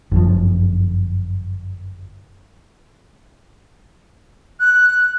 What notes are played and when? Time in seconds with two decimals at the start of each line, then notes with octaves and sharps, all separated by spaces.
0.12 G1 F#2 F3
4.60 F#6